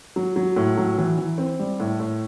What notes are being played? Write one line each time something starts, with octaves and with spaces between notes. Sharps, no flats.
F#3
F#3
A2
F#3
E3
E3
C4
G3
A2
A2